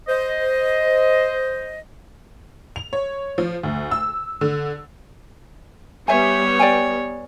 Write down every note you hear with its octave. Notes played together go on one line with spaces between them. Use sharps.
C5 D#5
F7
C#5
F3
D2
E6
D3
G3 B3 C#5 E5 G#5
D5 G5 G#5